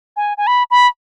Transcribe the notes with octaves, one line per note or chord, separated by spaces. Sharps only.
G#5
G#5
B5
B5